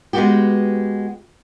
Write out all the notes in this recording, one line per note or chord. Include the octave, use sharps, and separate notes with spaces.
G#3 B3 F#4 G4